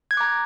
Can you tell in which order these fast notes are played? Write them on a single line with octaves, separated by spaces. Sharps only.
G#6 F#6 D6 A#5